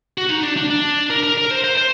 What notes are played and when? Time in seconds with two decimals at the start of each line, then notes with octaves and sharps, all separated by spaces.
0.18 F#4
0.29 D#4
0.43 D4
0.57 D4
0.70 D4
1.10 A#4
1.23 A#4
1.38 A#4
1.51 C5
1.64 C5
1.77 C5